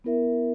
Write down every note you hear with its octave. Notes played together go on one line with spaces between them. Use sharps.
B3 E4 A#4 E5